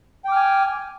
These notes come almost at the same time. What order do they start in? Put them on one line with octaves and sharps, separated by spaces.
G5 D6 F6 G#5